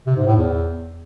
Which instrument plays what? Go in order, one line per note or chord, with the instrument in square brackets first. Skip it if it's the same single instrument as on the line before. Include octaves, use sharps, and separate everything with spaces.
[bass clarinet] C3
G#2
A2
E2